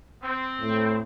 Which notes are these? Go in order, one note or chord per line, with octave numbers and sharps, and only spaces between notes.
C4
A2